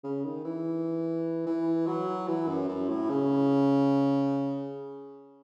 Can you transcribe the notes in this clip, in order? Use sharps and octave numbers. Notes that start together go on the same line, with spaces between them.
C#3
D#3
E3
E3
F#3
E3
F#2
F#2
A2
C#3